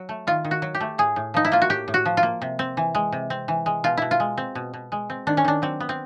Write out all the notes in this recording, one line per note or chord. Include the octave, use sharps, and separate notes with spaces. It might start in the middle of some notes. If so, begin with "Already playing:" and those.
Already playing: F#3
A3
D#3 F4
D#3
F#4
F#3
G4
A3
A2 G#4
A2
F3 D#4
E4
A#3 F4
F#4
A2 G4
A2
F#4
F3
F4
A#3
C3
C4
E3
G#3
C3
C4
E3
G#3
B2 F4
B2 E4
F4
G#3
C4
B2
B2
G#3
C4
D#3 D4
C#4
D#3 D4
F#3 C4
B3
C4